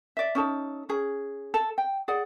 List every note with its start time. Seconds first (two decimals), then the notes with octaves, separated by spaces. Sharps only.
0.17 D5 E5
0.35 C#4 D#4 A4
0.89 C#4 G#4
1.54 A4
1.78 G5
2.08 G#4 D5 F#5